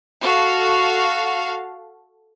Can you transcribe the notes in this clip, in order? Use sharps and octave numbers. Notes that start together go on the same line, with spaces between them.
F#4 A4 F5